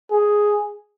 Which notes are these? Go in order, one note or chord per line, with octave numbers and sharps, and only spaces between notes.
G#4